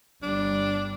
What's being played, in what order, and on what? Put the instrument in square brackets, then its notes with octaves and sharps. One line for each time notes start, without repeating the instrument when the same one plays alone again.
[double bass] G1 G3 [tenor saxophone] D4